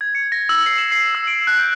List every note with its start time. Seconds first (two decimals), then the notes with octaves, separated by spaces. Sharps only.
0.01 G#6
0.15 C#7
0.32 A#6
0.49 E6
0.66 C7
0.78 E7
0.92 C7
1.15 E6
1.27 D7
1.47 F#6
1.59 G6